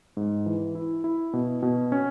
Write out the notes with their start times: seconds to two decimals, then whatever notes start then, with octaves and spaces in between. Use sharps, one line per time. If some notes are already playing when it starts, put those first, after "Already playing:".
0.17 G#2
0.46 E3
0.75 E4
1.04 E4
1.33 B2
1.63 B2
1.92 C#4